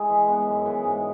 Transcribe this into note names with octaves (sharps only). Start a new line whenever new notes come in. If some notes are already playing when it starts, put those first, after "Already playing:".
Already playing: G#3 E4 G#4
E3
G#3 B3
F#2
E3 B3 G#4
G#2